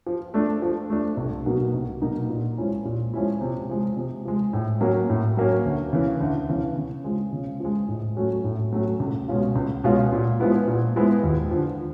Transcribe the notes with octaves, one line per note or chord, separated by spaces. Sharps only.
F3
A3 D4
F3
A3 D4
C2
B2 F#3 A#3 D#4
C2
B2 F#3 A#3 D#4
A#2
F3 G#3 C#4 E4
A#2
F3 G#3 C#4 E4
C3
F3 G#3
C3
F3 G#3
A2
F#3 A#3 C#4
A2
F#3 A#3 C#4
D2
C#3 E3
D2
C#3 E3
C#3
F3 G#3
C#3
F3 G#3
A2
F#3 A3 C#4 F#4
A2
F#3 A3 C#4 F#4
C#2
B2 G#3 C#4 F4
C#2
B2 G#3 C#4 F4
A#2
F3 G#3 B3 E4
A#2
F3 G#3 B3 E4
D#2
D3 F3